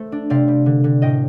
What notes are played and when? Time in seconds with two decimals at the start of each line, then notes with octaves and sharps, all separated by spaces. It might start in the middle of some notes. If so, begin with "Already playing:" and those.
Already playing: A3 C5
0.12 D4
0.30 C3 D5 F5
0.48 G3
0.66 D3
0.84 D3
1.02 A2 D#5 G5